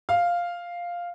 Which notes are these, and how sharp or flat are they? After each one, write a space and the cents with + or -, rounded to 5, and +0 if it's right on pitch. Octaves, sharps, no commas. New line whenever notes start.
F5 +0